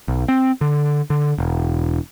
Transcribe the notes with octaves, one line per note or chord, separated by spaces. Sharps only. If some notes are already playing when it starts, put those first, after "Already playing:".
B1
C4
D3
D3
E1